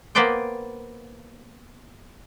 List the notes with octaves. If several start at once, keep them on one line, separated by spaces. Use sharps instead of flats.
A#3 B3 B4 C5 D5 G5